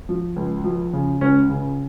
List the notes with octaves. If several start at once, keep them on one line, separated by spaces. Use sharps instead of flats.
F3
C#2
F3
C#3
C#2 C#4
C#3